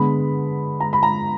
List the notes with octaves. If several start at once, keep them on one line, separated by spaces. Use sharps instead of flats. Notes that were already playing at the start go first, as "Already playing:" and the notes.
Already playing: D3 G#3 B3 B5
A#5
B5
A#5